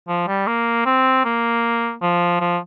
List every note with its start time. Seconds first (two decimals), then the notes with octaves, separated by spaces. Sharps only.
0.08 F3
0.28 G3
0.47 A#3
0.86 C4
1.25 A#3
2.02 F3
2.40 F3